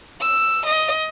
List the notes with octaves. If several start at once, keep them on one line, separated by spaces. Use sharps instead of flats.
E6
D#5